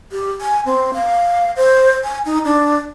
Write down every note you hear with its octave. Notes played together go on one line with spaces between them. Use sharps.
G4
G#5
C4
F5
C5
G#5
D#4
D4